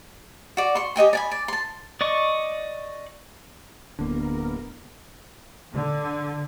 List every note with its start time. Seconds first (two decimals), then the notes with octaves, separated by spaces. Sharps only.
0.57 F#4 D5
0.75 C6 C#6
0.96 G4 D#5 G5 G#5
1.13 D5 G#5 B5
1.32 D5
1.48 A5 C6
2.01 D5 D#5 C#6
3.99 D1 D3 A#3 B3 A#4
5.74 D3